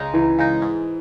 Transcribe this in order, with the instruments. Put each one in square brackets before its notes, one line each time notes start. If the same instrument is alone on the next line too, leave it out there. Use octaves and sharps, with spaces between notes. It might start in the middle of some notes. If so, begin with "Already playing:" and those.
Already playing: [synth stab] C#2 C#3 G#3 D#4
[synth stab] C#2 [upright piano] E3
[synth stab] C#3 G#3 D#4
G#2